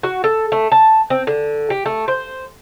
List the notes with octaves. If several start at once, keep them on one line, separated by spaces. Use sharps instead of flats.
F#4
A4
A3
A5
C4
D3
G4
A3
C5